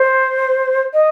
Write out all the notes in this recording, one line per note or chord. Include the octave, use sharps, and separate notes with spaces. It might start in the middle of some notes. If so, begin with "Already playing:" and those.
Already playing: C5
D#5